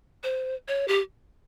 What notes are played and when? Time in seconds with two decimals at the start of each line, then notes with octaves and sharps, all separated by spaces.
0.23 C5
0.68 C#5
0.88 G4